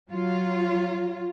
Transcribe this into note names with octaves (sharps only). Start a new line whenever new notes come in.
F#3 F4